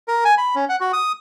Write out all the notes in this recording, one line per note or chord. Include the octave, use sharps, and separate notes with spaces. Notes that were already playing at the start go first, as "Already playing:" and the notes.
A#4
G#5
B5
C#4
F#5
F#4
D#6